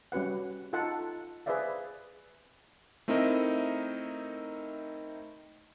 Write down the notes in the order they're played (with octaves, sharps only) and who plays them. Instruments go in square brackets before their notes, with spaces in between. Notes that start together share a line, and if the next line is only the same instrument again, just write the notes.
[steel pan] G3 C#4 F#4 B4 F#5
D#4 F4 A4 F#5 A5
G#4 B4 C5 D5 E5 F5
[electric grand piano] A3 C4 D#4 E4 A#4 D#5